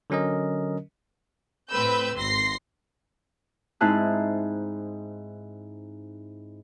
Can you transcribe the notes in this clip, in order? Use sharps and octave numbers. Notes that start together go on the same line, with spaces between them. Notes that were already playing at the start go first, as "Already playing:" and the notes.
D3 F#3 C#4 A#4 D#5
A2 C4 B4 B5 E6 G6
G#1 C6 A#6 C7
G#2 C4 D#4 E4 A5 F#6